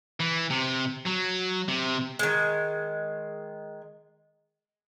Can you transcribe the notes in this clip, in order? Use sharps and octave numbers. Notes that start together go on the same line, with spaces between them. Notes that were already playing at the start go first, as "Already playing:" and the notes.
E3
C3
F#3
C3
D#3 G#3